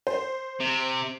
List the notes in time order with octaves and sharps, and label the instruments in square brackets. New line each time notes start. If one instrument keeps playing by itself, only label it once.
[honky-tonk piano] C5
[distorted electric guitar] C3